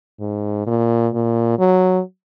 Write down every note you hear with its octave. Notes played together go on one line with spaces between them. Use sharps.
G#2
A#2
A#2
F#3